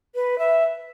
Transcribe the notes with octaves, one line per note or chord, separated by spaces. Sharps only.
B4
E5